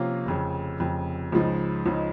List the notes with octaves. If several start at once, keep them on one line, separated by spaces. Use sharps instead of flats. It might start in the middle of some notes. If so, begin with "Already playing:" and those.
Already playing: C3 F3 A#3 C#4 F4
F1 F2 C#3
F1 F2 C#3
C#2 C#3 F3 G#3 D#4
C#2 C#3 F3 G#3 D#4